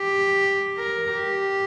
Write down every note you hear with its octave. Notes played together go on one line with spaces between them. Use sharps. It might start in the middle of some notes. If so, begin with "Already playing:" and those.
Already playing: G4
A#4
G4